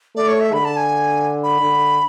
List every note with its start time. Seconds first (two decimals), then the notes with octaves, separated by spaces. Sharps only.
0.16 A3 D5
0.28 C#5
0.40 E5
0.53 D3 B5
0.65 A5
0.77 G#5
1.43 B5
1.61 D3